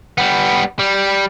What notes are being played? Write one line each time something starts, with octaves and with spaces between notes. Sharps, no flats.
G3 B3
G3